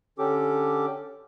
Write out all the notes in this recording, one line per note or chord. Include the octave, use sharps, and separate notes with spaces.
D3 C#4 G4 A4 D6